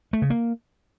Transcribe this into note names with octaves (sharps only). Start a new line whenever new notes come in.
A3
C#3
A#3